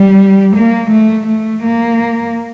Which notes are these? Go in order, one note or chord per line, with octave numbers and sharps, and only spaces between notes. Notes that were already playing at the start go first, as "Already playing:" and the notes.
Already playing: G3
A#3
A3
A3
A#3